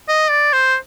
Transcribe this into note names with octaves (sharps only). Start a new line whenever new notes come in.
D#5
D5
C5